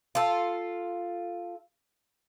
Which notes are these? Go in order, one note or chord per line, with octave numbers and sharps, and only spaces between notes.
F4 A4